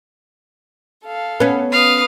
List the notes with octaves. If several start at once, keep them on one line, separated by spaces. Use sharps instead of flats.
A4 F5
B3 C#4
B4 F5 D#6